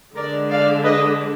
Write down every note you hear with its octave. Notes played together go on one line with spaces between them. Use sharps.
D3 G#3 D4 A#4 D5
D5 F5
B4 D#5